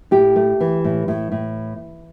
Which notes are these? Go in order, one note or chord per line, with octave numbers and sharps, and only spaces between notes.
A2 G4
A3
E3
A2
A2
A2